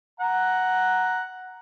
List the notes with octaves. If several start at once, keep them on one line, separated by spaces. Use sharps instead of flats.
F#5 A#5